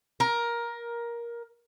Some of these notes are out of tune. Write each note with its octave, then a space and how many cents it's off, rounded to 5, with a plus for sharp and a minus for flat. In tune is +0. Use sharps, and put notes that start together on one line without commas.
A#4 +15